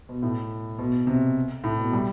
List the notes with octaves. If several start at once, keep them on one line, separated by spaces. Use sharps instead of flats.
B2
A2
B2
C3
A2
B2
G3